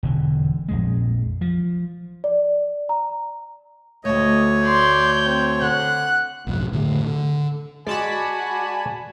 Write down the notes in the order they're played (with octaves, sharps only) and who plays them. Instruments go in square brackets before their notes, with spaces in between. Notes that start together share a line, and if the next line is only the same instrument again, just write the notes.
[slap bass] E1 D3
A#1 F2 G#3
F3
[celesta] D5
A#5
[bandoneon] D2 C#5 [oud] A3 A4 [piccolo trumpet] D#5
[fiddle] D5 C6 [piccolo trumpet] G6
[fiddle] C4
[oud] D3 A4 [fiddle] F#5 [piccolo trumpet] F#6
[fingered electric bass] B1 F2 G#2
A2 D3 A3
D3
[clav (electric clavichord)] G#3 [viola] F#4 [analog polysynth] D5 A5 B5 [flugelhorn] G#5